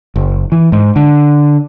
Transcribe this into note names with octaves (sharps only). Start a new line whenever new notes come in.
F#1
E3
G#2
D3